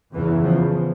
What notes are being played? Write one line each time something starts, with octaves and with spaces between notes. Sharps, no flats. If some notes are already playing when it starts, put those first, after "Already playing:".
E2 C#3 E3
F3